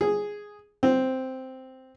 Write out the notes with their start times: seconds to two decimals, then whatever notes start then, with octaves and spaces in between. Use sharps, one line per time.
0.01 G#4
0.83 C4